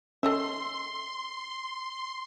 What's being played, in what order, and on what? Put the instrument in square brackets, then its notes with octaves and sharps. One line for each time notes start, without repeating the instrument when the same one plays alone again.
[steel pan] C#4 [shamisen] A4 D#5 E5 [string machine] C6